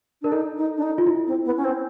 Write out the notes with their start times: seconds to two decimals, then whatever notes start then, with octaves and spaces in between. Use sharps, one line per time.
0.22 D4 A#4
0.32 D#4 A4
0.57 D#4
0.77 D4
0.82 D#4
0.98 F4
1.07 E4
1.27 C4
1.45 B3
1.57 C#4
1.64 C4